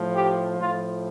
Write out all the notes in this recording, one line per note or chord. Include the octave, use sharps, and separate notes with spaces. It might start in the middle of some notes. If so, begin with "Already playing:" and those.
Already playing: A2 F3
G4
A2 F3 F4